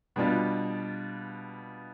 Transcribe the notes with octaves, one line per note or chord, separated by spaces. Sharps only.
B2 G3 B3 D4 F4